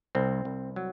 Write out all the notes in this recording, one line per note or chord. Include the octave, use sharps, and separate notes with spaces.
C2 C4
C2
F#3